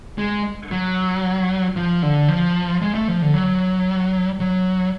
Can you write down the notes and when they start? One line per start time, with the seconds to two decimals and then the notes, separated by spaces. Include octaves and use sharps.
0.18 G#3
0.71 F#3
1.76 F3
2.02 D3
2.28 F3
2.81 G#3
2.95 A3
3.08 F3
3.22 D3
3.34 F#3
4.40 F#3